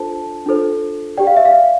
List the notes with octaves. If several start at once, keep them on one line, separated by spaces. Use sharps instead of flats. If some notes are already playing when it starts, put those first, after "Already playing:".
Already playing: D4 F4 A4 C5 A5
D4 F4 A4 C5
G4 D5 G5
F5
E5
F5